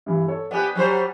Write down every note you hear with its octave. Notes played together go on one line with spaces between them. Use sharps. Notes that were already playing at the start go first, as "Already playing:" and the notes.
G2 E3
A4 C#5
B3 G4 D5 G#5 F#6
F#3 G3 C5